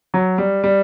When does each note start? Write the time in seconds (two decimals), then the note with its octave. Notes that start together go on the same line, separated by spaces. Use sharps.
0.14 F#3
0.38 G3
0.64 G3